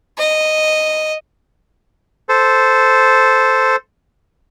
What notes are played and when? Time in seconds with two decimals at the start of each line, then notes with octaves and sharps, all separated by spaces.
0.18 D#5
2.29 A4 C5